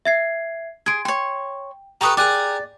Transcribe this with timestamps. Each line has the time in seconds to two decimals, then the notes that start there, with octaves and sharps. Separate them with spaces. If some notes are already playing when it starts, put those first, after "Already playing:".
0.05 E5 G#6 C7
0.86 G#4 C6 G#6 D7
1.05 C#5 G5 C6
2.01 G4 A4 B4 A#5 C#6 D#6
2.17 G4 G#4 A#4 D5 D6 F#6